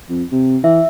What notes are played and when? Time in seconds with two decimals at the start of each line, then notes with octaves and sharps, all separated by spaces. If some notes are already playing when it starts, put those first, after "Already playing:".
0.09 F2
0.32 C3
0.64 E3 E5